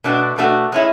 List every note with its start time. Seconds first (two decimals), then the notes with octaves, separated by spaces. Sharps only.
0.04 B2 A3 D4 F#4
0.38 B2 A3 D4 F#4
0.72 G#3 C#4 E4